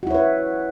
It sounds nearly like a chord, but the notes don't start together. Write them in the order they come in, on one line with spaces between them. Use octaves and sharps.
F#4 E4 C#5 B4